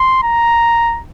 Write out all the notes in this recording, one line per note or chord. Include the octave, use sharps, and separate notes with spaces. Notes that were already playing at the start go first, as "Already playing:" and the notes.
Already playing: C6
A#5